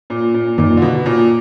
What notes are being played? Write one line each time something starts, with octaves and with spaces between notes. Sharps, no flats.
A#2
A#2
F#2 A#2 D#3 A#3 D#4
D3
B2
A#2